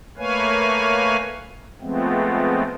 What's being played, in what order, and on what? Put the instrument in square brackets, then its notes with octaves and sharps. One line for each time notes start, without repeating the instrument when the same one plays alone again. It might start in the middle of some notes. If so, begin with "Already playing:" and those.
[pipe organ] A3 A#3 B4 C#5 F5 G#5
F3 G#3 A3 B3 C4